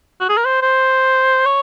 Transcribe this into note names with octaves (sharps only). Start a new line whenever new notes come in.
F#4
G#4
A#4
C5
C5
C#5